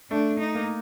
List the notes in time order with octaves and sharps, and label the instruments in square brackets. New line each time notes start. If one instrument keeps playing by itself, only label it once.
[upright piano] A3 [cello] D4
[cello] D#4
[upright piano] A#3